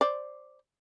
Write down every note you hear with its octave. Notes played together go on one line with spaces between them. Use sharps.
C5 D5